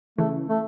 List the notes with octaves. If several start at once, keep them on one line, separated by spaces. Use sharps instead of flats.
C#3 E3 A3
A3